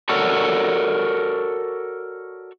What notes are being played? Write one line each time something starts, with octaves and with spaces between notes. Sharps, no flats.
F#4 A4 A#4 C#5 D5 F#5